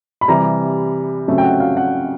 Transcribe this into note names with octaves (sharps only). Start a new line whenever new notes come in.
B5
C3 E3 G3 A#5
C#3 F#3 A3 C4
G5
F#5
F5
F#5